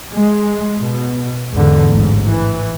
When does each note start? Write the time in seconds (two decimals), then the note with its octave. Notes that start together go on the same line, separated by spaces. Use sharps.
0.12 G#3
0.80 B2
1.54 E2 G#2 D3
1.92 A1 G#2
2.27 E3